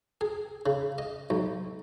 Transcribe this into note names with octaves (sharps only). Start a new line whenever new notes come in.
G#4
C#3
D#5
B1